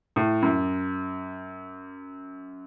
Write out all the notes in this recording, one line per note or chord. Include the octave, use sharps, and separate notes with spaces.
A2
F#2